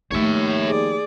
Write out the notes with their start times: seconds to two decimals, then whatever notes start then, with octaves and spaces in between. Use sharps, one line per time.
0.11 D#2 F3 A3 C#5 E5
0.66 G#4 D5